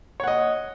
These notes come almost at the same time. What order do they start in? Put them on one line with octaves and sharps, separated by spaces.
C#5 F#5 D#5